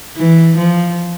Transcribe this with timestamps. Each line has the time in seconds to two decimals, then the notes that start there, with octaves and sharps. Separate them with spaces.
0.17 E3
0.58 F3